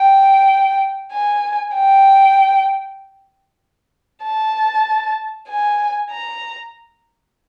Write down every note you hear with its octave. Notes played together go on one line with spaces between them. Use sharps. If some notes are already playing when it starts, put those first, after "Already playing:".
Already playing: G5
G#5
G5
A5
G#5
A#5